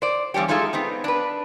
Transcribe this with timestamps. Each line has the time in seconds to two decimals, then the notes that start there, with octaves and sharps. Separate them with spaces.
0.02 C5 D5
0.34 E2 G2 G3 C#4 G4
0.48 G#3 D#4 F4 G#4 A4 E5
0.73 B3 C4 D#4
1.04 D4 B4